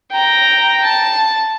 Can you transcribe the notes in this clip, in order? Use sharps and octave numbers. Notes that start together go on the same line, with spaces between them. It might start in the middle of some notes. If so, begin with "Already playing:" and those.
G5 A#5
A5